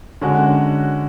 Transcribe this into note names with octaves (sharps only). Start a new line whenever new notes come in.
D3 G#3 C#4 F#4